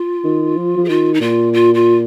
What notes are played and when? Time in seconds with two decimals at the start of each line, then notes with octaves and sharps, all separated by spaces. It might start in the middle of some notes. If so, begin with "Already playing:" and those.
Already playing: F4
0.24 D#3
0.57 F3
0.77 F3
0.84 G#4
0.89 D#3 F4
1.14 D#4
1.21 A#2 F4
1.53 F4
1.74 F4